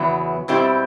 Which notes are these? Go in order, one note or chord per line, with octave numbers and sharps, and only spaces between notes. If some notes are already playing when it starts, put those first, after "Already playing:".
Already playing: E2 C#3 F#3 B3 E4
B2 G3 C4 E4 G4